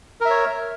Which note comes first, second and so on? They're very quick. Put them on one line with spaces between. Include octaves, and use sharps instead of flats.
A#4 E5 C#5